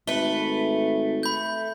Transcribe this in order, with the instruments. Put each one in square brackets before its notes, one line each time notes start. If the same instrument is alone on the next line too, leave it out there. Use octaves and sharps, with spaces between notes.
[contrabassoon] G#1 [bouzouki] A3 B4 [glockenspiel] G7
[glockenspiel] B5 G6